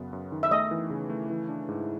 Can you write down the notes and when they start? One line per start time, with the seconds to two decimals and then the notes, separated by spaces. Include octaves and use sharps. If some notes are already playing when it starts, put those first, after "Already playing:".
Already playing: F#2 C#3 B3
0.13 F#2
0.32 D#3
0.43 E5
0.51 A3 D#5
0.71 E3
0.90 C#3
1.10 A3
1.30 E3
1.49 D4
1.69 G#2